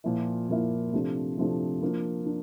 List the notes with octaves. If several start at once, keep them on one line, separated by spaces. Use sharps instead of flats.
A#2 F3 A#3 E4
A#2 F3 A#3 E4
C3 F3 A3 D4
C3 F3 A3 D4
F3 A#3 D4
D4